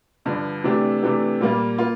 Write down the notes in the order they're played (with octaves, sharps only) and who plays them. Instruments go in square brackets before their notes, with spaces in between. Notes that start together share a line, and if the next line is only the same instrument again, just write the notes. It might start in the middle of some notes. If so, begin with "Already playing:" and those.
[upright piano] G2 D3 F3
C3 E3 A3 D4 G4
C3 E3 A3 D4 G4
A#2 G3 A#3 F4
A#3 F4